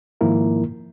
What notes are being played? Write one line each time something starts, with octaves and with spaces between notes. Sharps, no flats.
G#2 D#3 F3 A#3 E4 A#4